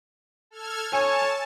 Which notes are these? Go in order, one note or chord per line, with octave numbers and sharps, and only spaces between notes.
A4 F6 G#6
C#5 G#5 A5